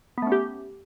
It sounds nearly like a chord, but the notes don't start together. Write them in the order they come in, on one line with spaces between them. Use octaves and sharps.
B3 A3 C#4 G4